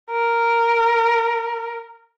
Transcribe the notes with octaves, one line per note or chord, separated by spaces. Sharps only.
A#4